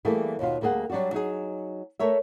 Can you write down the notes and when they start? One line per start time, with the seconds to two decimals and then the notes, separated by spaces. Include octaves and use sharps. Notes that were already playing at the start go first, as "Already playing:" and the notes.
0.05 E3 G3 A3 A#3 G#4
0.39 D#2 B2 F4
0.61 D2 G3 A#3 G#4 F#5
0.90 F#3 G3 D4 F4 F#4
1.13 F#3 D#4 G#4
1.99 A3 A#4 C#5 E5